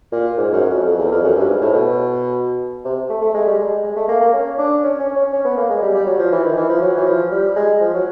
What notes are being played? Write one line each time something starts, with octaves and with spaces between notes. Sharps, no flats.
A#2
G#2
F#2
F2
F2
E2
F2
F#2
G2
G#2
A2
B2
C3
A3
A3
G#3
G3
G#3
G#3
A3
A#3
A#3
C#4
D4
C#4
C#4
C#4
C#4
B3
A#3
G#3
G3
G3
F#3
F3
E3
D#3
E3
F3
F#3
E3
F3
G3
G#3
F3
F#3